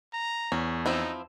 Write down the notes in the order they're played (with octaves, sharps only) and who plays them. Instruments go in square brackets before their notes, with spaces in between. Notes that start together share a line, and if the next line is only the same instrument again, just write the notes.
[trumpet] A#5
[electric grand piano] E2 [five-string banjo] C#4
[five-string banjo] F3 C4 E4 [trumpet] D#4